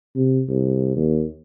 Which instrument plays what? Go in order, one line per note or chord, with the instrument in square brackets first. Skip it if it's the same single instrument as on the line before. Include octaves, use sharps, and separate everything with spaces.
[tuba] C3
C2
D#2